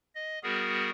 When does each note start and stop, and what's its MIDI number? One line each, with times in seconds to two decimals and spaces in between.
0.15 0.39 75
0.43 0.90 55
0.43 0.90 59
0.43 0.90 66
0.43 0.90 68
0.43 0.90 70